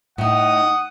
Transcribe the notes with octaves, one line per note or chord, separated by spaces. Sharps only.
A2 D#4 F#5 D#6